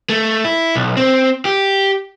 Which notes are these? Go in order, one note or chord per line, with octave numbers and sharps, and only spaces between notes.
A3
E4
B1
C4
G4